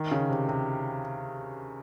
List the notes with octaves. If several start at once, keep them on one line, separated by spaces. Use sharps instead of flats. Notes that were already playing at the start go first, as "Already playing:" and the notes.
Already playing: D#3
C#3
C3
C3